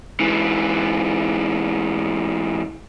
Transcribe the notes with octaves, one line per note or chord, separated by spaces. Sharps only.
G#2 E3